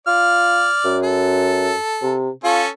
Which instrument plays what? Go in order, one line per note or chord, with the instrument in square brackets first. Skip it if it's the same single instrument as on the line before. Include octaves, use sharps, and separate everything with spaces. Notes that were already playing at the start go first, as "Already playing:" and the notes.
[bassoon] F4 [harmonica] D5 F6
[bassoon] F#2
[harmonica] A4
[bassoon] C3
[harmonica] C#4 A4 [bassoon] F4